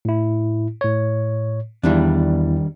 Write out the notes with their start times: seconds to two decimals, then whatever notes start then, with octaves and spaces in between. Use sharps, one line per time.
0.05 A2 E4
0.81 A2 C#5
1.83 E2 D#3 G3 D4 E4